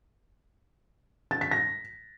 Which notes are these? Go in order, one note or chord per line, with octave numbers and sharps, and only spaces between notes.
A6
B6
A#6